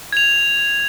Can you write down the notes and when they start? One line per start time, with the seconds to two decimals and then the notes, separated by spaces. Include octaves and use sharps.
0.13 G#6 F7